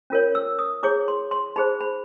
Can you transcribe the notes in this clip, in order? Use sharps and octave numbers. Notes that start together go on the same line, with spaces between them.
C#4 F4 A#4 C#5
E6
D#6
E4 G#4 C#5 D6
C6
C6
D#4 G#4 C5 B5
B5